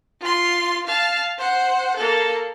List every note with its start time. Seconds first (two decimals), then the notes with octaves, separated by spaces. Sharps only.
0.21 F4 C6
0.87 F5 A5
1.38 C5 F#5
1.97 A#3 A4